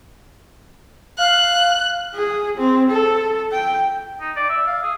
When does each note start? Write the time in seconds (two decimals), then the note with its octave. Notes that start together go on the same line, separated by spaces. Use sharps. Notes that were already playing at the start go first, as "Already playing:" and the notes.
1.18 F5 F#6
2.14 G#4
2.58 C4
2.91 A4
3.52 G5
4.20 D#4
4.36 D5
4.49 E5
4.67 F5
4.83 G#4